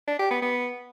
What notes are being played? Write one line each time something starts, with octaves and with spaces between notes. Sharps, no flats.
D4
G4
B3
B3